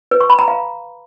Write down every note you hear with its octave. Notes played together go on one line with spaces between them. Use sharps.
B4
C#6
B5
A#5
F5